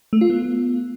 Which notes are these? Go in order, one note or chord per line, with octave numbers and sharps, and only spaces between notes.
A3
F4
B3